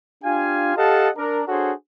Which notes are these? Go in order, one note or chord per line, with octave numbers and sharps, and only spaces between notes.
D4 F4 G4 F5 G#5
G4 A4 D#5 F5 F#5 A5
D4 A#4
D4 F#4 G#4 A4 C5 C#5